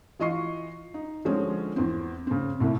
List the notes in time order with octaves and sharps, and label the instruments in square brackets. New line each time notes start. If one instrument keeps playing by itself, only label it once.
[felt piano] E3 F4 D#5 C#6 C7
D#4
D3 F3 G#3 C4 C#4
E2 C4
C#3 C4
C2 A2 C3